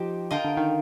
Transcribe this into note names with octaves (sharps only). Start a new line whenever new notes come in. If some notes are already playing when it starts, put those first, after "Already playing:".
Already playing: F3 D#4 G4 C5
D3 F4 A#4 D#5 G5
D3
D#3